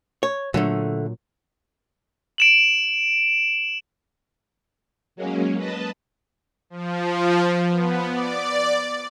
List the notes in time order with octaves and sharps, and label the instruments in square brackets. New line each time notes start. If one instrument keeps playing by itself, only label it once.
[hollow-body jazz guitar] C#5
[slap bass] A#2 F#3 [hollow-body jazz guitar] D3 A3
[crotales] D7 E7 F#7
[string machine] F#3 G#3 A#3 C#4
B4 D#5 A5
[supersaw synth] F3
B3
D5